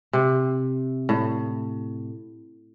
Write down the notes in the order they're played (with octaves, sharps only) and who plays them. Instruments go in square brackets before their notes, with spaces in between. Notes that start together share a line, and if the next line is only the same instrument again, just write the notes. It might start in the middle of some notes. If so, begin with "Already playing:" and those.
[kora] C3
A2